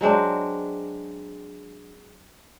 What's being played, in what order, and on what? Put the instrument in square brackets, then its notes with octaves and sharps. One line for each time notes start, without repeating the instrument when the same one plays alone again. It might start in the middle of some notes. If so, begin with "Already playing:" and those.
[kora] F#3 G#3 C4 D4